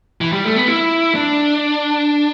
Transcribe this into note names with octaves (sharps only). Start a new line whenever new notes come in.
E3
G3
A3
B3
E4
D4